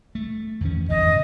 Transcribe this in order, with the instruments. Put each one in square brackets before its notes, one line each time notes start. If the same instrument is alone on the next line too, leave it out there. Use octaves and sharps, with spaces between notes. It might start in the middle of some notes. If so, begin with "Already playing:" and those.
[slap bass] A3
E2 D#3 C#4
[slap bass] F1 G#2 E3 [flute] D#5